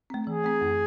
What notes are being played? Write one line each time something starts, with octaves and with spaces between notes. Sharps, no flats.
A3 C4
E3 G#4
A3 C4
F#2